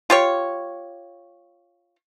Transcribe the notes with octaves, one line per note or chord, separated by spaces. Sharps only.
F4 G4 C#5